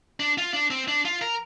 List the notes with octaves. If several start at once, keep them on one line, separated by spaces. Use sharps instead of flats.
D4
F4
D4
C4
D4
F4
A#4